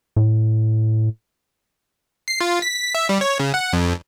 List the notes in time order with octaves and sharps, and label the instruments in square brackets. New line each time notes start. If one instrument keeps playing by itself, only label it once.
[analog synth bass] A2
[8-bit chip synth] C7
F4
B6
E5
G3
C#5
C#3
F#5
F2